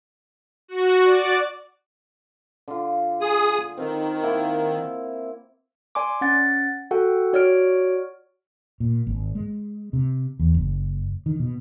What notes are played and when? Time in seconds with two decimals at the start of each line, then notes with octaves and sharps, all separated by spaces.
0.68 F#4
1.05 D5
2.68 D3 F4
3.21 G#4 D#6
3.78 D#3 C4
4.23 A#3 E4 F#5
5.95 D5 G#5 C6 D6
6.21 C#4 F#5 A6
6.91 F#4 A4 F#5 G5
7.33 F#4 C#5 D5 F6 D7
8.80 A#2
9.07 G#1
9.35 G#3
9.93 C3
10.39 E2
10.55 F#1
11.26 D#3
11.40 B2